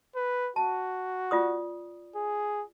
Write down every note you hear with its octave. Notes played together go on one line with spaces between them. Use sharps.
B4
F#4 A5
F4 D5 D#6
G#4